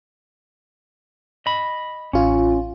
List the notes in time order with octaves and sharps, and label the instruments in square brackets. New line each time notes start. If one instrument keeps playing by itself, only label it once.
[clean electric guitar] D#5 B5
[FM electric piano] A1 F4 [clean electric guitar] C#4